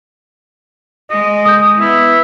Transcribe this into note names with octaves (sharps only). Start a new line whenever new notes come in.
G#3 D#5
D#6 G6
B3 E4